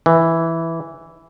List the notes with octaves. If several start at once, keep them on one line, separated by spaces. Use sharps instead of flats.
E3